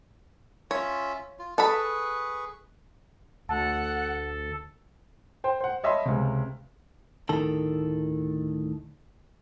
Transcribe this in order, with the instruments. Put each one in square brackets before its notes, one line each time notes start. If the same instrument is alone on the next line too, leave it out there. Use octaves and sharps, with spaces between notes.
[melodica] C#4 F4 E5 [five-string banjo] C#5
[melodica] F4
[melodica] G#4 B4 C#6 [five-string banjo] A4 A5 B5
[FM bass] D2 [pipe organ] A4 [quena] F#5 [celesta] A5 A6
[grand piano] C5 G5
C5 F#5
C#5 D#5 E5 A5 B5 C6
C#2 C3
[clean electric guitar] D2 A2 D#3 A4